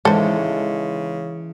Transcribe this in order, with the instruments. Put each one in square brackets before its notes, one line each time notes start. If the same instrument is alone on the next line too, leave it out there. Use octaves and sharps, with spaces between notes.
[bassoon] C#3 [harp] E3 [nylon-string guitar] G#3 B3 D#4 [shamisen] A4 C5